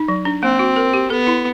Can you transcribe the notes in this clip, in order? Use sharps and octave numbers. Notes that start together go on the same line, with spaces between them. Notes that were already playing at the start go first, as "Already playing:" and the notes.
Already playing: D#4
F#3
D4
A#3 C4
F#4
A#4
G4
B3 A4
E4